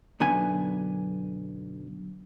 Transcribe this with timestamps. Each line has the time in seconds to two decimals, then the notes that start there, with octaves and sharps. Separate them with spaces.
0.20 B1 F#2 D3 B3 G#5